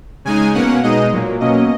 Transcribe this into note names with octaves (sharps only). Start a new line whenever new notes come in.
C#3 G#3 D#4 G#5
B2 A#3 C#4 F#5
B2 G#3 D#4 D#5
A#2 F#3 A#3
B2 F#3 A#3 C#4 D#5